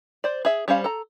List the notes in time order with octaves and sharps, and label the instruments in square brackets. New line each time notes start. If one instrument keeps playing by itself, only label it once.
[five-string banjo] C5 D5
G#4 E5
G3 C#4 C5 F5
A4 A#5